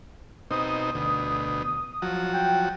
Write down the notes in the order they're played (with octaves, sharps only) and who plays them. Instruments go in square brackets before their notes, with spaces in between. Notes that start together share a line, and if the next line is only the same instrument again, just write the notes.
[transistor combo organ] B2 C4 D#4 [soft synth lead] D#6
[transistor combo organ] D2 B2
F3 F#3 F#4
[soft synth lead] G5